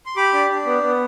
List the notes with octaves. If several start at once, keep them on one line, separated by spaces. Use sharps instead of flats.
C6
G4 B5 D6
D4
D4
B3
B3